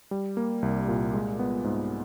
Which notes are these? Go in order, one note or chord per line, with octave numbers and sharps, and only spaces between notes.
G3
A#3
C2
A#2
G#3
B3
G#2